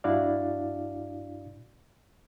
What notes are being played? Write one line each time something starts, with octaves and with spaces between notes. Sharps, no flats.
G2 D4 E4 F#4 D5 F5